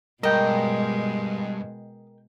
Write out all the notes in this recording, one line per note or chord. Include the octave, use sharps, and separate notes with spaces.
G2 B2 G#3 A#4 D#5 G5